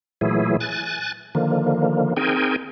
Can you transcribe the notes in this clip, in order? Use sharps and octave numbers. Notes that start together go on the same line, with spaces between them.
A#2 E3 F#3 A3 E4 G#4
G#5 F#6 A6
D3 D#3 F3 A#3
C4 D#4 G#4 A#4 G5 G#5